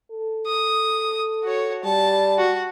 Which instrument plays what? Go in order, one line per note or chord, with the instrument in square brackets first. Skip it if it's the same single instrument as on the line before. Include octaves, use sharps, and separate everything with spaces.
[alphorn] A4
[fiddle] D#6
F#4 C#5
[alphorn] G3 [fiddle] A5
[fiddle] F#4